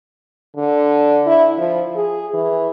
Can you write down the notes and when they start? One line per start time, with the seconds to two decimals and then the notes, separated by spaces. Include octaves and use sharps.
0.57 D3
1.27 E4
1.57 F3
1.96 G#4
2.34 E3